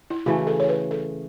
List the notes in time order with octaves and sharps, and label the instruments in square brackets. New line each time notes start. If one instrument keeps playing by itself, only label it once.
[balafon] E4
[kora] C#3 E3 A3 [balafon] F#4
[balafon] A4
C#5
B4
A4